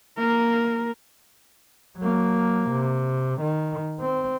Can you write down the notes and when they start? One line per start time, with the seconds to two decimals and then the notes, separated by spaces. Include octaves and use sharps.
0.18 A#3 A#4
1.98 F#3 A#3
2.70 C3
3.41 D#3
4.01 C4